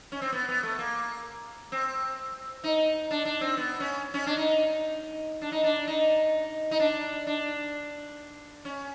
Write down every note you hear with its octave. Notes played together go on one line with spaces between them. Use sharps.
C#4
C4
B3
B3
A3
A#3
C4
D#4
D4
D4
C4
B3
C#4
C#4
D4
D#4
D4
D#4
D4
D#4
D#4
D4
D4
C#4